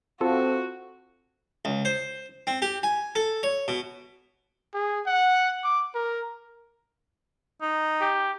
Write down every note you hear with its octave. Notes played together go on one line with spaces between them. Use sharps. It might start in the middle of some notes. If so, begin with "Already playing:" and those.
C4 F4 F#4 A4
C#2
C5
C4
G4
G#5
A4
C#5
B2
G#4
F#5
D6
A#4
D#4
G4